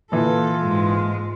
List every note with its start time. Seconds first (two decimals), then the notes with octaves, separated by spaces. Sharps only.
0.12 A#2 E3 F4 A4
0.63 G#2 G#3